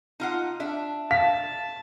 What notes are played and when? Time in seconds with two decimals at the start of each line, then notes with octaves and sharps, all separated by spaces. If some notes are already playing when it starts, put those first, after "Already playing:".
0.20 D#4 F4 F#5
0.60 D4 E5
1.11 F5 A5 B6